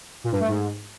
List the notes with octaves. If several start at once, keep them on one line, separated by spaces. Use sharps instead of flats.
A#2
G2
A3
G#2